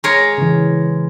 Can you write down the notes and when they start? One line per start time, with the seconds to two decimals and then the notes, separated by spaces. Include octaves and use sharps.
0.04 G#3 A#4 C#5
0.38 C#3 E3